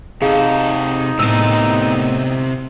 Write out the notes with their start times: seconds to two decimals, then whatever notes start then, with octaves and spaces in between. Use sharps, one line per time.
0.22 C3 D#4 G#4 A4 F5
1.19 A2 C3 B3 A#4 E6 D#7